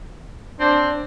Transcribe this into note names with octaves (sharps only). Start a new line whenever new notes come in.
C4 D4